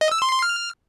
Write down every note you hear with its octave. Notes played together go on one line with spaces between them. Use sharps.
D#5
E6
C6
C6
F6